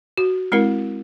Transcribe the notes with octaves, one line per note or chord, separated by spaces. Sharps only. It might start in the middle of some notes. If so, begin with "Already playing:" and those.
F#4
G#3 C4 E4 A#4